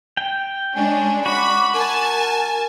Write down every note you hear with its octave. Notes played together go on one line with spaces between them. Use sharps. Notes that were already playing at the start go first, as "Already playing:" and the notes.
G5
G#3 C#4 D4 G#5
F#4 B5 D6
A#4 G#5 A5